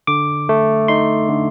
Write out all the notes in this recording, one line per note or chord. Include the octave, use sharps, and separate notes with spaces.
D3 D6
A3
D#4 C6
D3